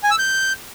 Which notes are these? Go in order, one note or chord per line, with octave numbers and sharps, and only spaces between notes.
G#5
E6
G6